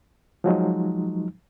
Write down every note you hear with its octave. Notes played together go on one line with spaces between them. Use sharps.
F3 F#3 G#3 D#4